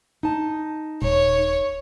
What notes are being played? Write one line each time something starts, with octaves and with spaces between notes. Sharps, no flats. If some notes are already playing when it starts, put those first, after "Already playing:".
D#4 A5
D#1 C#5